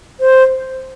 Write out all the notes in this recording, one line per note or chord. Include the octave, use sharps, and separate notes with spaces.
C5